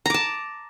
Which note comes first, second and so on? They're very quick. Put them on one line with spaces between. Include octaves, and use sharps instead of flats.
A#5 D6 A5